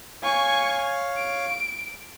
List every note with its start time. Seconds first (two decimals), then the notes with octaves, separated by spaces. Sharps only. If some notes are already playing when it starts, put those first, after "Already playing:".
0.23 C#5 F5 G#5 C#6
1.17 D7